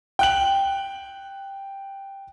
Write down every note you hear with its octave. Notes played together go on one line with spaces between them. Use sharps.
G5 F#6 F#7